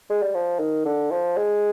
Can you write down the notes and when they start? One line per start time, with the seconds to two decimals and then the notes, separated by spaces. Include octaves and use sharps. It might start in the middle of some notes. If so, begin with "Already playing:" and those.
0.10 G#3
0.22 G3
0.35 F3
0.59 D#3
0.85 D3
1.11 F3
1.37 G#3